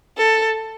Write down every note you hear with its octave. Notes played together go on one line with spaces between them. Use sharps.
A4